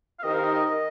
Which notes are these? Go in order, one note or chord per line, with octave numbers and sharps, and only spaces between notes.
F5
D#3 C4 D#4 G4 A#4 D#5
F5
D#5
D#5
D#5